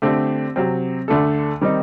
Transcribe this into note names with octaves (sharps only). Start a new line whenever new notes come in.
D3 A3 C4 G4
C3 F#3 C4
D2 D3 A3 D4 A4
D#3 G3 C4 D#4